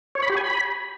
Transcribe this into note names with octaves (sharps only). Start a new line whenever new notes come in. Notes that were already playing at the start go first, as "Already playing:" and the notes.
C#5
B5
G4
G#5
B5